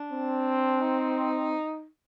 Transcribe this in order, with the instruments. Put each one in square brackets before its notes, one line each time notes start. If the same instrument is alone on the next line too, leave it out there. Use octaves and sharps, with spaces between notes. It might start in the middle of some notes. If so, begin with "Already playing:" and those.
Already playing: [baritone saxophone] D4
[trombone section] C4
[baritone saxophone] D#4